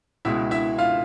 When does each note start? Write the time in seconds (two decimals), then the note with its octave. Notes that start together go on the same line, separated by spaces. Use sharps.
0.25 C#2 B2 G#3 E4 E5
0.51 E4 E5
0.78 F4 F5